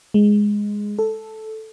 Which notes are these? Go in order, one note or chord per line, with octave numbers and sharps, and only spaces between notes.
G#3
A4